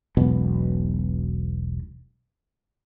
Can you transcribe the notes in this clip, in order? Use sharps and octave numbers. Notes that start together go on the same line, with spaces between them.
E1 B1 B2